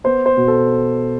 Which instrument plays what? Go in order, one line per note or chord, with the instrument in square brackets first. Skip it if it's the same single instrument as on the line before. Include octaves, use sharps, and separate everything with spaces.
[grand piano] B3 C5
C5
B2
A4